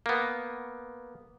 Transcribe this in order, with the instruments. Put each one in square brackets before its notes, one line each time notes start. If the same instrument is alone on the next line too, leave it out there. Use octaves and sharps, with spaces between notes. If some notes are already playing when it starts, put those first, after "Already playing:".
[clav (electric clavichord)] A#3 B3